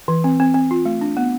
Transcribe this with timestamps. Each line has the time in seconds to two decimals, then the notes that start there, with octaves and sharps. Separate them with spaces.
0.08 E3
0.24 C4
0.40 C4
0.54 C4
0.71 F4
0.85 A3
1.01 D4
1.17 B3